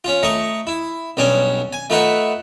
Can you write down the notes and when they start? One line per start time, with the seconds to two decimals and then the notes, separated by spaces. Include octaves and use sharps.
0.04 C#4 F4
0.23 A3 D#5 A#5 C#6
0.67 E4
1.17 B1 G2 C#4 D4 G#5
1.73 G#5
1.90 A3 D#4 F4 B4 E5 F#5